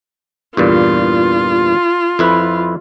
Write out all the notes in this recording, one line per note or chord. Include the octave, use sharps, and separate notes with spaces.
E2 G2 A#2 F4
F2 E4 B4